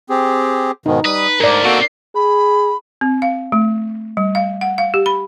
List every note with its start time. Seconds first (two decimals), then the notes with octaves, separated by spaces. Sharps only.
0.09 C4 G4 G#4
0.86 G#2 B2 D#3 D#4
1.05 G3 B4 D#6
1.40 D2 G#2 A#4 D5
1.64 B2 A#3 C4 F#4 A4
2.15 G#4 B5
3.01 C4
3.22 F5
3.52 A3
4.17 G3
4.35 F5
4.61 F#5
4.78 F5
4.94 G4
5.06 B5